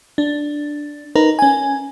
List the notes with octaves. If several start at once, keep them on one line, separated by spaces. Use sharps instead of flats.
D4
D#4 A#4 B4
C#4 G#5